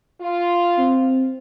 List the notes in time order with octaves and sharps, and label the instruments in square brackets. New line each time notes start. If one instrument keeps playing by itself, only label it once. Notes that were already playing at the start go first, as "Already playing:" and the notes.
[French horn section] F4
[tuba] C4